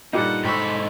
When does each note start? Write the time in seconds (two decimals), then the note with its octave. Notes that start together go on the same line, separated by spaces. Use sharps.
0.13 G2 A#2 G3 D#4 A4 F#5
0.45 G#2 A4 G5 B5 C#6 E6